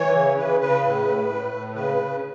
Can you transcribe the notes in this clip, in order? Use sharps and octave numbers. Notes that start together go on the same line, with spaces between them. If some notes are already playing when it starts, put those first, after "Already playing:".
Already playing: E3 C#5
C#3
C#3 B4
C#3 B4
A2
A2
A2
A2
C#3 B4
C#3